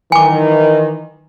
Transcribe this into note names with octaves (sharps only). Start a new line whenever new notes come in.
D#3 E3 G#5 D6